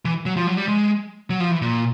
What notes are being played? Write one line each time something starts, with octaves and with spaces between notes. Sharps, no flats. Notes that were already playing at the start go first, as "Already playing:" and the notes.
E3
F#3
F3
F#3
G3
G#3
F#3
F3
E3
A#2